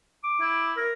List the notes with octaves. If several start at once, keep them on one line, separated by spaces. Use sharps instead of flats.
D6
E4
A#4